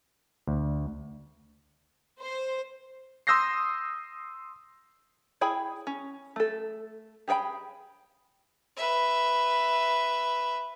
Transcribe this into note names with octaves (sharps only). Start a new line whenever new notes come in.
D2
C5
C6 D#6 E6 G6 A#6 C7
E4 G#4 G5 B5
C#4
A3 A4
G4 G#4 A#4 G5 B5
B4 E5